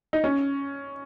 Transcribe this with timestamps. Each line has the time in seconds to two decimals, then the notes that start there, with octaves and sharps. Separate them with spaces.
0.13 D#4
0.24 C#4